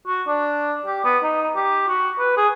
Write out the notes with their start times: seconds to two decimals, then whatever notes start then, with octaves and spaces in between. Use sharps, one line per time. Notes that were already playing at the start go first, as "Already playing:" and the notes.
0.07 F#4
0.27 D4
0.86 G4
1.04 B3
1.23 D#4
1.56 G4
1.88 F#4
2.19 B4
2.37 G#4